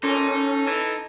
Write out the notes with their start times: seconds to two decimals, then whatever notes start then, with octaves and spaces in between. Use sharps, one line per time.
0.03 A#2 C#4 D#4 A4
0.66 E3